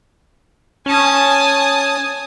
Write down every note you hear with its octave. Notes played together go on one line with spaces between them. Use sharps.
C#4 G#5 A5 D#6